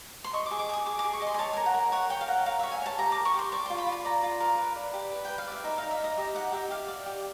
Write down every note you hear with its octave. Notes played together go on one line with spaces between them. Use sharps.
C6
D#5 C#6
D6
G#4
D6
G#4 D#6
G#4 D6
D6
G#4
C#6
D#5
C6
G#5
C#5 A5
A#4 G#5
F#5
A#4
C#5 F#5
C#5 G5
F5
A#4 F#5
A#4 F5
C#5 E5
G#5
C#5 A5
G4 A#5
D6
A#4
C#6
G4 C6
D5 C#6
F4 C6
B5
F4
B5
D5 A#5
F4
A#4
B4
D5
G4
B4
B4 G5
F5
D5 E5
D#4 E5
D#4 F5
E5
D#4 D#5
G4 E5
D#4 F#5
G4 E5
G4 F5
D5
G4